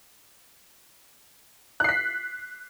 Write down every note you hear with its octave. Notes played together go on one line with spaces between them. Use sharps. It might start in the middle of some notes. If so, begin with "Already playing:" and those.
F#6 B6 C7